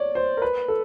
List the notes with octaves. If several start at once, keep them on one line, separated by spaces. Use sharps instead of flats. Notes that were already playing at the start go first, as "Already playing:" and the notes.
Already playing: C#5 D5
C5
A#4
B4
A4